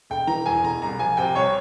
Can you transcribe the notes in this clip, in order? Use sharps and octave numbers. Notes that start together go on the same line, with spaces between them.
E1 G5
E3 A#5
E2 G#5
E1 A#5
C2 A#5
F3 G#5
C3 G5
C2 C#5